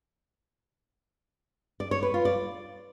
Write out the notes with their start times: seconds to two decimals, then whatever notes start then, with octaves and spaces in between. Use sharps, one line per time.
1.80 D5
1.91 C#5
2.03 B4
2.14 F4
2.25 D5